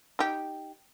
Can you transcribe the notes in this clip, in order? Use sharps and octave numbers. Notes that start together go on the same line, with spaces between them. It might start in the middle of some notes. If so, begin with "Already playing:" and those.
D#4 G4